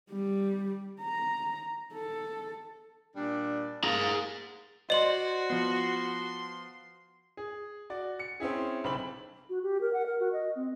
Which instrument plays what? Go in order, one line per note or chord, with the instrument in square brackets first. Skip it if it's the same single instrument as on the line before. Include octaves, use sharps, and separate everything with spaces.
[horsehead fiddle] G3
A#5
A4
[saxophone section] A#2 G3 D4
[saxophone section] A#3 [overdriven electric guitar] G#4 A#5
[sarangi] F#4 [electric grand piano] C5 D5 C6 [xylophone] D#5 F#7
[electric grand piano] F3 B3 [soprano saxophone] C6
[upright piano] G#4
F#4 D5
C#7
C4 C#4 E4 G#4
B1 C#3 C4 B5 F#7
[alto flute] F#4
G4
A#4
F#5
A#4
F#4
D#5
C4